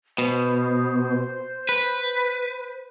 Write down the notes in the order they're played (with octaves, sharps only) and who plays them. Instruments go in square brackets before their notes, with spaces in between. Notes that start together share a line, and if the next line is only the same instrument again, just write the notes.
[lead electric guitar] B2 [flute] C5
[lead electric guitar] B4